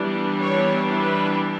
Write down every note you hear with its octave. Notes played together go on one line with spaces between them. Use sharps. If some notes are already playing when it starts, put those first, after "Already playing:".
Already playing: E3 G3 B3 D4
C#5
B4